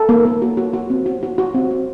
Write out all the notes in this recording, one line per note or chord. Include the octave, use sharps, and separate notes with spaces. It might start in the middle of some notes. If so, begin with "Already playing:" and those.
Already playing: A4
A#3
A#3
F#4
F#4
F#4
C4
F#4
F#4
F#4
C4
C4